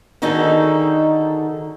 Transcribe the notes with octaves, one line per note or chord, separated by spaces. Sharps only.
D3 D#3 D#4 F#4 G#4 A4